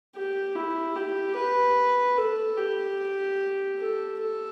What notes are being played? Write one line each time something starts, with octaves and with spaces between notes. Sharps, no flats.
G4
E4
G4
B4
A4
G4
A4
A4